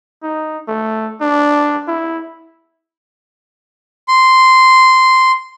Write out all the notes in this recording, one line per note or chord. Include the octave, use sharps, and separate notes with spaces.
D#4
A3
D4
E4
C6